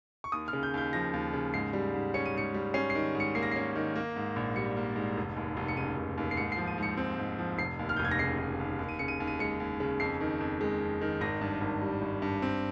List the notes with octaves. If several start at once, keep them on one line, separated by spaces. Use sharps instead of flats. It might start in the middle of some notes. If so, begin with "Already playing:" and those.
C#6
D#2 D#6
F6
C#3
G6
D#2 G6
F3 A#6
D#2
C#3
G#2 C7
G3
G#2
C#4 C#7
D#7
G#2 C#7
G3
C#4 C7
C7
D#3
G#2
C#7
A#3 C7
A#6
C#4 C7
D#3
A#3
G#2
A#1
G3 C#7
A#3
G#2
F1
D#2
F1
C#7
C#3 D#7
F1
D#2
C7
G#2 C#7
C7
F3
D#7
G#2 C#7
C4
G#2
F3
F1 C7
D#2
F6
G6
F1
G#6
A#6
C#3 C7
F1
D#2
D#2
D#7
C#3 C#7
D#7
D#2
D#7
G#3 C#7
D#2
C#3
F2 C7
D#3
F2
G#3
F2
D#3
G#1 A#6
G2
G#1
G3
G#1
G2
C4